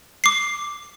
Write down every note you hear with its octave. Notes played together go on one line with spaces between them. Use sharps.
D6 C7